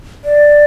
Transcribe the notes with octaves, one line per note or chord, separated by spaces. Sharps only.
D5